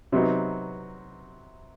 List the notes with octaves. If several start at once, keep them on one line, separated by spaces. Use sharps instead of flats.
C3 F#3 B3 D#4